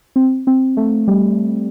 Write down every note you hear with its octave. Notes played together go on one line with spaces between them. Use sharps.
C4
C4
A3
G3